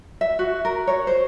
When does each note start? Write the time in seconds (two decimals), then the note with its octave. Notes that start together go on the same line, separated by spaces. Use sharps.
0.21 E5
0.39 F#4
0.65 A#4
0.87 C#5
1.07 C5